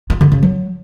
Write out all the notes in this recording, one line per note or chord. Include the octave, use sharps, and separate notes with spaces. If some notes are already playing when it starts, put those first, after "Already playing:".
F4
D3
C#3
F#3